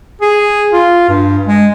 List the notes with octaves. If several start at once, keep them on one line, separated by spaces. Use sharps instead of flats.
G#4
F4
G2
G#3